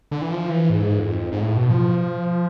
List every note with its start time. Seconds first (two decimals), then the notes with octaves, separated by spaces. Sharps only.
0.11 D3
0.21 E3
0.30 F3
0.50 E3
0.70 G#2
0.99 F2
1.32 G#2
1.41 A2
1.56 B2
1.70 F3